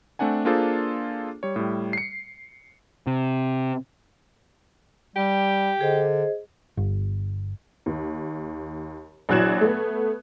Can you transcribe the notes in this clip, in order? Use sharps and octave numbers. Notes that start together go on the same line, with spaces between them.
A3 C4 D4 F#5 G#5
A#3 D4 F4 G#4 A4 C5
G3 C#5
A2 G3
C7 C#7
C3
G3 G4
D3 G#4 C5 D#5
G1
D#2
A#1 E3 F#3 F#6 G#6 E7
A3 B3